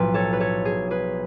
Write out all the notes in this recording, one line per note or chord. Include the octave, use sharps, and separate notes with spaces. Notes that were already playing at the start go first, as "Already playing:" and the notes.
Already playing: B1 A2 F3 B4
A4 C#5
B4
A4 C#5
G#4
G#4 B4